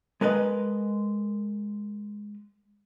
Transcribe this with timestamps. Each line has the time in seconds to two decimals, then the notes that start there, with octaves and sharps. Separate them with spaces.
0.21 G#3 A#4 B4 D#5